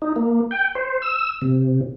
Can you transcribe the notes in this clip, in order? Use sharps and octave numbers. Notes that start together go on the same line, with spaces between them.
D#4
A#3
G5
C5
E6
C3